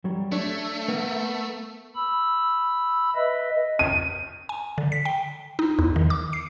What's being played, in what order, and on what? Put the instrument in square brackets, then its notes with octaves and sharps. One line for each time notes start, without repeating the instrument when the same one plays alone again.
[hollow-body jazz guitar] F#3 G3
[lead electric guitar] A3 [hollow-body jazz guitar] D4 C#5
[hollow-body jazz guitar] A#3 B3
[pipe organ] B5 E6
B4 D#5 E5
[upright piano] D#7
[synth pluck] G#5
D3
B6
G5
D#4
E2
D#3
D6
C7